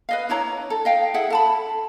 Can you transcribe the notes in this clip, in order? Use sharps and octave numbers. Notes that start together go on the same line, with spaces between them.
B4 D#5 F5
D4 E4 C#5 A#5
A4
D#5 F5 G5
E4 G#4 E5 F#5
A4 A5 B5